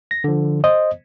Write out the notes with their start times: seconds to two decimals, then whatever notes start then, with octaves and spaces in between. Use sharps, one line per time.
0.11 A#6
0.24 D3 F3
0.64 C5 D#5